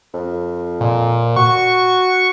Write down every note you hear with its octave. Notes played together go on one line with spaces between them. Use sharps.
F2
A#2
F#4 C#6